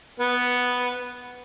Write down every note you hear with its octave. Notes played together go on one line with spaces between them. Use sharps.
B3